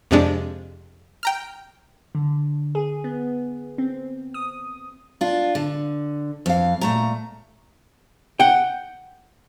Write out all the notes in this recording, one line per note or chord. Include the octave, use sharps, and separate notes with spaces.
F2 C3 G#3 D4
G5 A#5 F6
D3
G#4
B3
C4
D#6
D4 F4
D3
F2 F5
A#2 A3 A#5
F#5 G5